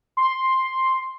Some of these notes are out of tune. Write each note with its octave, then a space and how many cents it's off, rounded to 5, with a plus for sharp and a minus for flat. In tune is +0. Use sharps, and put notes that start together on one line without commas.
C6 +5